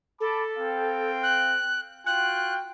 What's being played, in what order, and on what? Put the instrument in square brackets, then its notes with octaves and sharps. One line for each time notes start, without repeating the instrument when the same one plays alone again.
[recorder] A4 [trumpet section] A5 B5 D6
[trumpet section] C4 F5 G5
[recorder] F#6
[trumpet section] F4 F#4 G5 [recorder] F#6